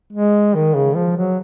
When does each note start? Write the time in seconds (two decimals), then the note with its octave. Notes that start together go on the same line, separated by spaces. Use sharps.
0.13 G#3
0.55 D#3
0.75 C#3
0.96 F3
1.17 F#3